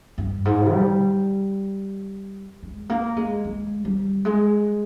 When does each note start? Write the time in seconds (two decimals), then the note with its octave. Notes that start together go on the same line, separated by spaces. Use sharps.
0.18 G2
0.45 G#2
0.72 G3
2.63 G#3
2.90 A#3
3.16 G#3
3.44 G#3
3.85 G3
4.25 G#3